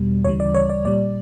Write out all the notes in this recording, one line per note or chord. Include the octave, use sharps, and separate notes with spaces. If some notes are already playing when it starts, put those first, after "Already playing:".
Already playing: E2 B2 G3
D2 C#3 E3 G3 C#5
D5
C#5
D5
A#2 G3 D5